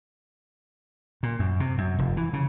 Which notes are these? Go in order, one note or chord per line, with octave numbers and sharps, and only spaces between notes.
A#2
F#2
C3
F#2
F1
E3
C#3